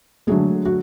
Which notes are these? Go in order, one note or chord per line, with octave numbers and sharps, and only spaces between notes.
D3 F#3 G#3 A3 G#4
F#4